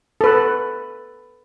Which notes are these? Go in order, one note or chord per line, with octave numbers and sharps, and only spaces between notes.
A4 B4